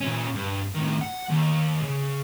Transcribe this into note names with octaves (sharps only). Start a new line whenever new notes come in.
A#2 C#4
G2
A2 D#3
F#5
D#2
C#3